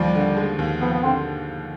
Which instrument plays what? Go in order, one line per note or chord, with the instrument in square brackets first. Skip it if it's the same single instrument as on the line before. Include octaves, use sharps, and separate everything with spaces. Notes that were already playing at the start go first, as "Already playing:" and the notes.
Already playing: [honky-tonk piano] D#2 F3 [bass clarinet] G3
[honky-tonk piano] D3
G#3
D#2
[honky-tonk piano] F3 [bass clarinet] B3
[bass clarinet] B3
[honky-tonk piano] D3 [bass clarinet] C4